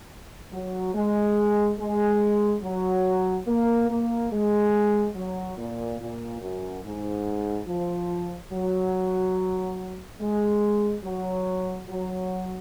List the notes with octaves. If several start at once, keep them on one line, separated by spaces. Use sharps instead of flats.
F#3
G#3
G#3
F#3
A#3
A#3
G#3
F#3
A#2
A#2
F#2
G#2
F3
F#3
G#3
F#3
F#3